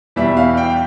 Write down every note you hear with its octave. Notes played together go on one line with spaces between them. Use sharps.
E2 B2 G3 E5
F5
G5